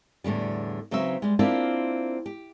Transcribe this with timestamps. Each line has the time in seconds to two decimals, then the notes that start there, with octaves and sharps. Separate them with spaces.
0.24 E2 A2 D3 G3
0.91 C#3 F#3 C4 D#4 B4 E5
1.22 G3 G#3
1.39 A#3 C4 D4 E4 F4 G4
2.26 G4